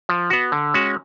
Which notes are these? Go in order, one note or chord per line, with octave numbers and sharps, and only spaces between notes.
F3
B3 F#4
D3
G#3 C#4 F#4